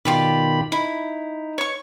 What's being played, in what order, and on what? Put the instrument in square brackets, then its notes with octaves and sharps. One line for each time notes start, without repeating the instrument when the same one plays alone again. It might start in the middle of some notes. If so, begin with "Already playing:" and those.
[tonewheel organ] B2 D#3 B5 [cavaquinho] F4 G4 D5
[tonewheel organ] D#4 [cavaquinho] E4
[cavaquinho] C#5 C#6